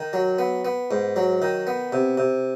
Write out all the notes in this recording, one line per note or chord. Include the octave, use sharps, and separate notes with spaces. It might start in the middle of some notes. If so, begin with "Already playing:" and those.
Already playing: D#3
F#3
B3
B3
G#2
F#3
D#3
B3
C3
C3